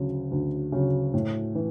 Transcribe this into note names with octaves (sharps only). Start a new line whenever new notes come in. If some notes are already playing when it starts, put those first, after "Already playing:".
Already playing: D2 C#3 F#3
D2
C#3 F#3
A2
E3